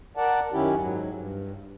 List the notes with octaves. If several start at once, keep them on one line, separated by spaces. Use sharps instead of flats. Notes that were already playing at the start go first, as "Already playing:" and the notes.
A#4 D5 F#5 A5
F#2 D#3 C#4 E4 G4
G#2 F#3
G2